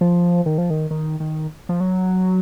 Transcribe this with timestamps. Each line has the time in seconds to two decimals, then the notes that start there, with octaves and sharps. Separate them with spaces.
0.01 F3
0.46 D#3
0.58 F3
0.70 D#3
0.91 D#3
1.20 D#3
1.69 F3
1.80 F#3